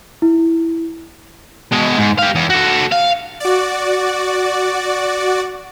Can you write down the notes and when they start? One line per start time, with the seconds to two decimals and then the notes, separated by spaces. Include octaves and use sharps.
0.22 E4
1.72 B2 G#3
1.98 G#2
2.18 G4 F5
2.35 E2
2.50 F#4 A4
2.92 F5
3.40 F#4 D5